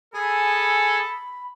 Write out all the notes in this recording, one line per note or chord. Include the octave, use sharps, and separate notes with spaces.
G#4 A4 G#5 B5